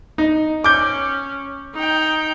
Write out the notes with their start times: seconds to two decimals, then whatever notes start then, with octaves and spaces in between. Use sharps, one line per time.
0.18 D#4
0.64 C#4 D6 G6
1.75 D#4 G5